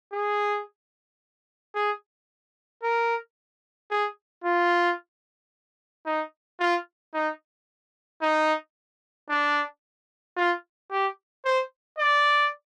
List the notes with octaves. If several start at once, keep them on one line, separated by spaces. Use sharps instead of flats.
G#4
G#4
A#4
G#4
F4
D#4
F4
D#4
D#4
D4
F4
G4
C5
D5